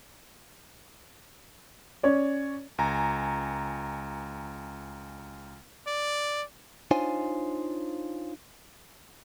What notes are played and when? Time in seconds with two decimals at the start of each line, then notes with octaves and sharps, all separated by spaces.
2.03 C#4 C#5 D5
2.78 C#2 G#5 A#5
5.87 D5
6.91 D4 D#4 F4 C5 C#5 G#5